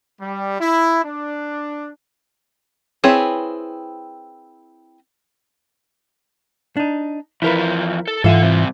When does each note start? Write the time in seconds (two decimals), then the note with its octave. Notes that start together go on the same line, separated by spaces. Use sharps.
0.21 G3
0.60 E4
1.04 D4
3.04 C4 E4 G#4 B4 C#5
6.77 D4 D#4
7.42 E2 F3 E4 A#4 B4
8.08 A4
8.24 G#2 E3 F4 A4 E5 F#5
8.43 C2 C3